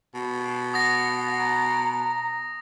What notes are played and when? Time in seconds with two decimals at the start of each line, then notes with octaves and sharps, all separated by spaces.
0.15 B2
0.74 F#5 D#6 A#6
1.38 A#5